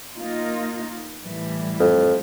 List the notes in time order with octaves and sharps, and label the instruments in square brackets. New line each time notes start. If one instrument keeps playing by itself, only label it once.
[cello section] A#3 D#4 F4
A2 E3 G3
[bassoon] F2